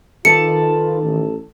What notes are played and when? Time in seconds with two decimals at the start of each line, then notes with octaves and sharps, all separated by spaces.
0.25 D#3 F4 A4 B4 D5 A5 C#7
1.02 A1